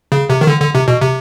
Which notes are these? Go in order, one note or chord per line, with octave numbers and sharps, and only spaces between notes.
C#3
C3
D#3
D3
D3
C3
B2
C3